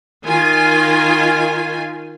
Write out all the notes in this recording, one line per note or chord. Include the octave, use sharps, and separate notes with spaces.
D#3 F4 G#5